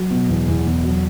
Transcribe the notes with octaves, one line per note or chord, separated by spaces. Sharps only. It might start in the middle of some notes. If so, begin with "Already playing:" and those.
Already playing: F#3
B2
E2
E2
E2
F#3